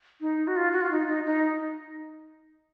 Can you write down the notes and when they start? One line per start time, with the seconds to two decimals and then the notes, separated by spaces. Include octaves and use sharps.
0.21 D#4
0.47 F#4
0.56 F4
0.73 F#4
0.81 F4
0.91 D#4
1.08 D#4
1.26 D#4